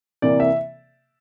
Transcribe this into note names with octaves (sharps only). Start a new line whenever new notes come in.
C3 E3 A#3 D5
E5